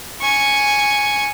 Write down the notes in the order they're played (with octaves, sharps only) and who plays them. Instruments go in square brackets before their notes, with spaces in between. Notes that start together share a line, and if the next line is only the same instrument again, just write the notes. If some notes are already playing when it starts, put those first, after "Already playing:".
[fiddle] G#5 C#6